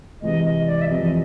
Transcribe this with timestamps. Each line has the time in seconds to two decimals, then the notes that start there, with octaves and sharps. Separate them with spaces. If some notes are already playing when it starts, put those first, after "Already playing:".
0.22 C3 E3 G#3 D#5
0.44 D#5
0.66 D5
0.82 E5
0.88 F2 C3 E3 D#5